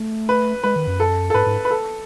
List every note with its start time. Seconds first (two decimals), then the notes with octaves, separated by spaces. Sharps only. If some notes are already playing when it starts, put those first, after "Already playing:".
Already playing: A3
0.29 B4
0.63 G#3 B4
0.76 D#3
0.87 F#2
1.00 A4
1.30 A4
1.34 G#2 B4
1.47 G#2
1.65 B4
1.71 A4